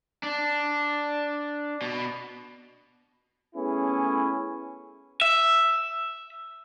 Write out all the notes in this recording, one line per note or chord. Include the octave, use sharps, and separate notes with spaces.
D4
B2
A3 B3 C#4 E4 G#4
E5